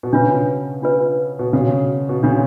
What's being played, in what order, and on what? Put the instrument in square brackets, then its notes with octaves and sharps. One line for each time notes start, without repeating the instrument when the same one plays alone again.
[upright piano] B2
[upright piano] C#3 [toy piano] D4 F4 B4
[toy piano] D4 F4 B4
[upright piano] B2
[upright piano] C#3 [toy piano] D4 F#4 A4
[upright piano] B2
[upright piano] C#3 [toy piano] D4 F#4 A4